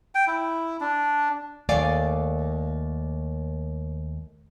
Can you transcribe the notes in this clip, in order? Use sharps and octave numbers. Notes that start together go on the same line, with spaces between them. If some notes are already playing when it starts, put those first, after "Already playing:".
G5
E4
D4
D#2 A3 D5 F5 G#5